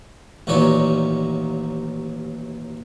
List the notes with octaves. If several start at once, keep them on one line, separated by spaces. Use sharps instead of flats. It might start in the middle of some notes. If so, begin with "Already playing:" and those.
A1 D#2 A#2 F#3 C#5 D5